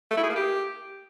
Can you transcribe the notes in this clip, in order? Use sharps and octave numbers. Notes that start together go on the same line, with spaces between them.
A3
E4
G#4
A#3
G4